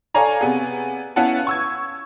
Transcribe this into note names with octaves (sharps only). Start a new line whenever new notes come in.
A4 C#5 D5 F5 G#5 A#5
C3 B3 G#4
B3 C#4 E4 F5 F#5 A5
C#6 E6 G#6